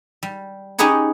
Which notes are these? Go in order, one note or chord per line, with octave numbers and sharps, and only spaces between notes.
G3
C#4 D#4 G4 G#4 B4 C#5